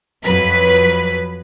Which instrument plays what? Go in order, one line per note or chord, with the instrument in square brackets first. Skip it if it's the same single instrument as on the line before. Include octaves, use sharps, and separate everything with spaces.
[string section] F2 F#3 B4 B6